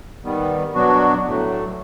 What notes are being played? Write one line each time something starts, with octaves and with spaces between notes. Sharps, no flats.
D#3 G3 B3
B2 F#3 B3 D4 F#4
A2 F#3 A3